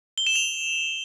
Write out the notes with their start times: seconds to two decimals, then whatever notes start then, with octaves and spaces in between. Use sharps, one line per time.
0.18 G7
0.27 E7
0.35 F7